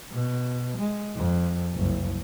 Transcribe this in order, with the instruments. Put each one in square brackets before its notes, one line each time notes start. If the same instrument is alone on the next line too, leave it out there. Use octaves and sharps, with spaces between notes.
[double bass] B2
G#3
F2
F#1 C2